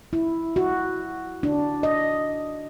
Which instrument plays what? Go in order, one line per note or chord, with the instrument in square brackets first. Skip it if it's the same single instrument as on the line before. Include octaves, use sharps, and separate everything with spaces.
[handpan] E4
F#4
D4
D#5